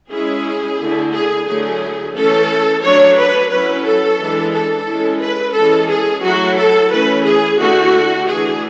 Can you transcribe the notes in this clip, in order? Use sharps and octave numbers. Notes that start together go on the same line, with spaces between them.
G#3 C#4 E4 G#4
D3 A3 E4
G#4
D3 F#3 A3 E4 G#4
E3 A3 C#4 A4
F#3 A3 D4 C#5
B4
F#3 C#4 E4 B4
A4
E3 G#3 D4
A4
G#3 C#4 E4
B4
E3 G#3 C#4 A4
G#4
F#3 A3 E4 F#4
A4
E3 A3 C#4 B4
G#4
D3 A3 E4 F#4
E3 A3 D4 G#4